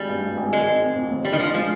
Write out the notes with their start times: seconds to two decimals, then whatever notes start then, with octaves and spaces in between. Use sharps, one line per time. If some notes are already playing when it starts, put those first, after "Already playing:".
Already playing: G#1 G3
0.09 G2
0.23 G#1
0.37 G#1
0.52 D#3 G#3
0.67 C4
0.81 C4
0.95 F2
1.10 D#2
1.25 G3 D4
1.33 D#3
1.39 F3 D4
1.54 F3 G#3